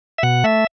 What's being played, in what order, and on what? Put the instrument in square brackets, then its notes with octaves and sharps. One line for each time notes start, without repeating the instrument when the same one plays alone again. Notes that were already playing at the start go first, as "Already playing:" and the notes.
[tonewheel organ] E5
B2 F#5
A3 E5